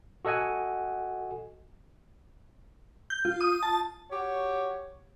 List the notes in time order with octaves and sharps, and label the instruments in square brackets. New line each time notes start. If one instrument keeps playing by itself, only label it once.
[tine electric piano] F#4 A4 D#5 F#5 G#5
[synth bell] G6
F4
D#6
A5
[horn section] F#4 G4 C#5